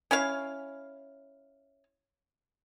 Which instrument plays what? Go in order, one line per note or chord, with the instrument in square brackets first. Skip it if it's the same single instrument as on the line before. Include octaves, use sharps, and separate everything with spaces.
[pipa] C#4 E4 C#5 F5